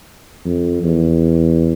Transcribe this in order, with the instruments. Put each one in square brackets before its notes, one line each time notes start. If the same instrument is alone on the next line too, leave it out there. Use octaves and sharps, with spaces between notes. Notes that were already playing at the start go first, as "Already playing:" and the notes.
[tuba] F2
E2